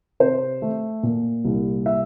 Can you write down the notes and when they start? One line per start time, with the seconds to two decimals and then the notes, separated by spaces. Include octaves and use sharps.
0.20 C3 C5
0.62 A3
1.03 A#2
1.45 C2
1.86 E5